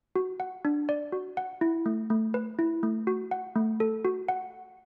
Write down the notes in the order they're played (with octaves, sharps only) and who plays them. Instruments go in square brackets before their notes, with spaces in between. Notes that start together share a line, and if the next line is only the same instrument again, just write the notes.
[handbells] F#4
F#5
D4
D5
F#4
F#5
E4
A3
A3
B4
E4
A3
F#4
F#5
A3
A4
F#4
F#5